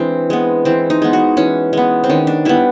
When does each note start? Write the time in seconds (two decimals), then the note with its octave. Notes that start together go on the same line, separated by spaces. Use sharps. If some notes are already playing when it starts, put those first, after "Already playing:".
Already playing: E3 G#3 C4 D4
0.30 G#3 B3
0.65 E3 C4
0.90 D#4
1.02 G#3 B3
1.13 F#4
1.37 E3 C#4
1.73 G#3 B3
2.04 C4
2.09 D#3 C#4
2.27 D4
2.45 G3 B3 E4